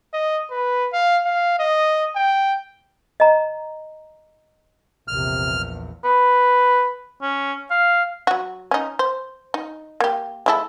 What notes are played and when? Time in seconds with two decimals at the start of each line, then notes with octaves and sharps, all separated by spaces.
0.14 D#5
0.51 B4
0.93 F5
1.25 F5
1.59 D#5
2.16 G5
3.20 D#5 A#5
5.08 A#1 E2 C3 F6
6.04 B4
7.22 C#4
7.71 F5
8.27 F#3 F#4
8.71 C#4 D#4
8.99 C5
9.54 D#4
10.00 A#3 G4
10.46 G#3 E4 A4